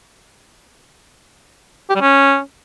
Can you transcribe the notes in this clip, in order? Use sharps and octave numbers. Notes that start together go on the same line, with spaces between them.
G4
G3
C#4